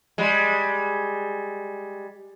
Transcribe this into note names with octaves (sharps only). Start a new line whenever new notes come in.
G3 G#3